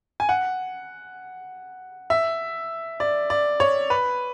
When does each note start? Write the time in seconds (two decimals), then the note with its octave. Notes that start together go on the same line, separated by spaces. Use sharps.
0.20 G#5
0.29 F#5
2.10 E5
3.00 D5
3.30 D5
3.60 C#5
3.90 B4